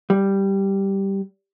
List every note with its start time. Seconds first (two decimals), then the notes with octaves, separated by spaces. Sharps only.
0.10 G3